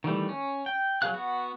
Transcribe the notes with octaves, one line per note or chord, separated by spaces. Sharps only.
D#3 E3 G3 A3
C#4
G5
F#3 G#4 A#4 F5 F#6
B3 F#4